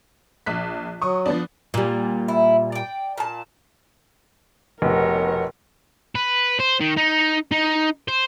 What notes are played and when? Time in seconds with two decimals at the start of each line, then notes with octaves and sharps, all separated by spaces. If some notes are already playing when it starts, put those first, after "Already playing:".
0.46 A#1 F#6 B6
1.02 F#3 C#6 D#6
1.26 F3 B3 D4
1.74 A#2 G3
2.28 E4
2.72 D5 G5
3.18 A#2 A5
4.82 F1 B2 A#4 C#5
6.15 B4
6.59 C5
6.80 D#3
6.97 D#4
7.52 D#4
8.08 C5